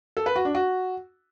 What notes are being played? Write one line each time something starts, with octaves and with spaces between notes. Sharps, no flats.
A4
B4
F#4
D4
F#4